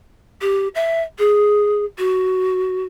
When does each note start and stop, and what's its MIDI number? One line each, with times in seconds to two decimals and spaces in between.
0.41 0.68 67
0.75 1.02 76
1.19 1.85 68
1.98 2.84 66